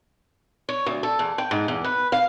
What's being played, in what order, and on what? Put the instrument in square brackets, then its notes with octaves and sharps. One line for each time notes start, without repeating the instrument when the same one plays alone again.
[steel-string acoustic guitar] C#5
D2
A4
E2
G5
G#2
E2
B4
F5